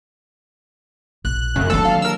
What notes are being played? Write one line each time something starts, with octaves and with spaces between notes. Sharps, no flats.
A#1 F#6
F#2 C#3 C4
D#3 E3 F#3 A#3 D4 A4
F5
A#4 E6